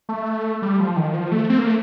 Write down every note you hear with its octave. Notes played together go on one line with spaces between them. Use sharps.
A3
G3
F3
D#3
F3
A3
C4
A#3
A3